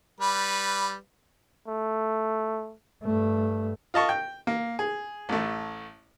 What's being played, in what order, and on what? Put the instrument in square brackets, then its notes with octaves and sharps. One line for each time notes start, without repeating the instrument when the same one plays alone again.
[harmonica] G3 B4
[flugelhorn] A3
[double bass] G2 A3
[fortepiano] F4 D#5 A5 C#6
G5
A#3
G#4
A1 A3